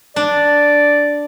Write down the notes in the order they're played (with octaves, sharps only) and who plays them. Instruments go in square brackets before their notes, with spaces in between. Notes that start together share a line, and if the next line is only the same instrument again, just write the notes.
[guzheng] D4 [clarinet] D5